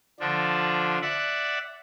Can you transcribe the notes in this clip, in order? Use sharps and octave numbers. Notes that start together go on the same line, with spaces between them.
D3 F3 D4
D5 E5 F#5